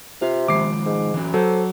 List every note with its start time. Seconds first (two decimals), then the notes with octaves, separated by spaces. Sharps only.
0.22 C3 F4
0.48 D#3 F3 G#3 D6 C7
0.86 G#2
1.14 E3 F#3 C#4
1.34 F#3 A4 C5